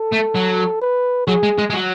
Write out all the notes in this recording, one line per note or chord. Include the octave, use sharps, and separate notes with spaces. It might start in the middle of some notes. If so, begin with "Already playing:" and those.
Already playing: A4
A3
F#3
B4
F#3 G#4
G#3
G#3
G#3
F#3